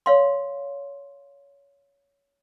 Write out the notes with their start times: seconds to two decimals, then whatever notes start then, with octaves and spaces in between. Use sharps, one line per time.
0.06 C#5 F5 C6